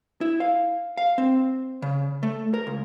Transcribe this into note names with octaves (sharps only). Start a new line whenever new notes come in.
E4
F5
F5
C4
C#3
A3
A#4
C#2